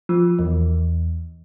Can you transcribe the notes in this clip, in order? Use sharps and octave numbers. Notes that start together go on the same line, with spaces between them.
F3
E2